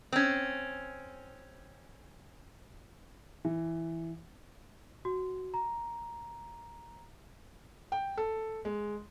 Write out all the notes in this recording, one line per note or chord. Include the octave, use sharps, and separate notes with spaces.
C4 C#4
E3
F#4
A#5
G5
A4
G#3